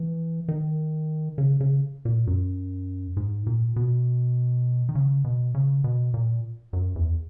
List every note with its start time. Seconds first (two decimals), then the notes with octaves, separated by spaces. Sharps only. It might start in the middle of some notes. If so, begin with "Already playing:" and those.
Already playing: E3
0.48 D#3
1.38 C#3
1.60 C#3
2.05 A#2
2.27 F#2
3.17 G#2
3.47 A#2
3.76 B2
4.89 D#3
4.95 C#3
5.24 B2
5.55 C#3
5.84 B2
6.14 A#2
6.73 F#2
6.96 E2